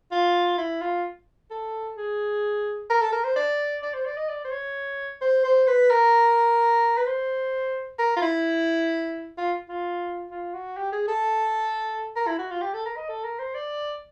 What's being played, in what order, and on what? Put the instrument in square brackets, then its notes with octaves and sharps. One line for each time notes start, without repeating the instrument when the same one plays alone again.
[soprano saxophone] F4
E4
F4
A4
G#4
A#4
A4
A#4
C5
D5
D5
C5
D5
D#5
D5
C5
C#5
C5
C5
B4
A#4
B4
C5
A#4
F4
E4
F4
F4
F4
F#4
G4
G#4
A4
A#4
E4
F#4
F4
G4
A4
A#4
D#5
A4
A#4
C5
D5